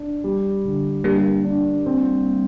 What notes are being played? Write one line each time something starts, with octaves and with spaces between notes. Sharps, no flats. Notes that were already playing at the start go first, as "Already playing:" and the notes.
Already playing: D4
G3
D3
G3 A#3 D4
D4
C4